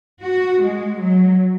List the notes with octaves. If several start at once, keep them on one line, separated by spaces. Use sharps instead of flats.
F#4
G#3
F#3